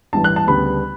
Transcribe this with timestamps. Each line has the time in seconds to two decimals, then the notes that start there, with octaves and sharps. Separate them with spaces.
0.13 A1 G2 E3 A5
0.24 F#6
0.36 A5
0.47 D2 C#3 G3 B3 B5